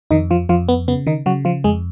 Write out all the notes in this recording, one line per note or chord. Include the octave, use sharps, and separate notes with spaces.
F2 D#3 D#4
F3 F4
F2 F3 F4
B3
C#3 B3
D#3 D#4
C#3 F#3 F#4
F3 F4
F2 G#3 G#4